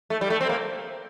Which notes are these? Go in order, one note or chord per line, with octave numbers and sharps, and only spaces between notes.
A3
G3
A3
C4
A#3